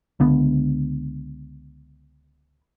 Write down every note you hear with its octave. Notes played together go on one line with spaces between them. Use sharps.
C#2 D3 B3